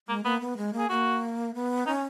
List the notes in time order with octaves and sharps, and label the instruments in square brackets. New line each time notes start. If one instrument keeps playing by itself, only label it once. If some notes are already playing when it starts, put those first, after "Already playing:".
[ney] G#3 [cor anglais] A#3
[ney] A#3 [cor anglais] B3
[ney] B3
G#3
A#3
[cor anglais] G#4
[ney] A#3 [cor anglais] F#4
[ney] B3
[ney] C#4 [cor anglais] D#4